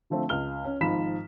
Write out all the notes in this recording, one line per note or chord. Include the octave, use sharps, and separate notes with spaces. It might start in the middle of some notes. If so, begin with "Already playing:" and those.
D3 F3 A3 C4
C#2 F6 G7
C#4
G#1 G#2 F3 B5 B6 E7